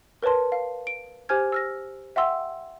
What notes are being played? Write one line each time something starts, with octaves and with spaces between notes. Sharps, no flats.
A#4 B4 C#5 A5 C6
F5
D7
G4 C5 G#5 F6 G#6
E6 F6 A#6
E5 F#5 G5 C6 E6